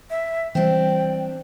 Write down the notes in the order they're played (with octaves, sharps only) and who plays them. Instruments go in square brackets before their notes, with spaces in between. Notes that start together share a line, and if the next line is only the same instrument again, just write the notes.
[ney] E5
[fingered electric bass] E3 G3 [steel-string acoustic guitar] C4 D4 [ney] G5